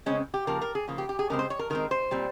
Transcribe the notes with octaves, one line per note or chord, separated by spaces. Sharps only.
C#3 G#3 C4 C#4
G4
C#3 F3 A#3 A#4
A#4
G#4
C#3 F3 A#3
G4
G4
G#4
C#3 G#3 C4 A#4
C5
C#5
A#4
D#3 G#3 C4 A#4
C5
A#2 G3 C4